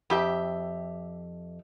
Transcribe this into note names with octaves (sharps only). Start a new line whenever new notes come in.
F2 G4 E5